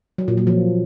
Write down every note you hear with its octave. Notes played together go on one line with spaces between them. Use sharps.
F#3
A#2
F#3
F3